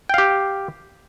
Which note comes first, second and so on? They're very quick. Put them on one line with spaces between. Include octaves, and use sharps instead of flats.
G5 F5 G4